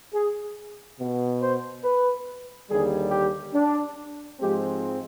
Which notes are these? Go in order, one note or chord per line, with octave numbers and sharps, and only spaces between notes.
G#4
B2 B3
C5
B4
D#2 D3 G3 G#4
G4
D4
G#2 F3 G#3 C4 G4